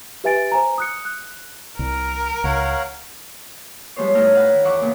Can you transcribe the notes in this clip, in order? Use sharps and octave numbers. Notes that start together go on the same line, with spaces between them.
G4 B4 E5 G#5 A6 D7
C5 G#5 A#5
D#6 F#6 C#7
F#6
C2 A#4
C#2 C#5 F5 F#5
F3 G3 G#3 B3 C5 C#5
A2 B3 D#4 E4 A#5 F6
F5 F#5 A#5 B5
D#3 E4
E2 E5 F#5 C#6 D6
A#2 C#3 A#3 B3